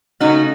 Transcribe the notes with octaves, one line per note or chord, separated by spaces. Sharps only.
C#3 A3 C#4 D#4 F#4